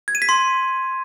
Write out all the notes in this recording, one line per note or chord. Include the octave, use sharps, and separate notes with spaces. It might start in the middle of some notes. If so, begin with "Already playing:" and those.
G#6
D#7
B6
C6